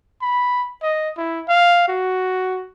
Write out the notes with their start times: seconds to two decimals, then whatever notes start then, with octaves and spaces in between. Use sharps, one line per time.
0.22 B5
0.82 D#5
1.17 E4
1.48 F5
1.88 F#4